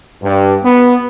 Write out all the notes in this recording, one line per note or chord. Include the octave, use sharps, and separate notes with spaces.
G2
B3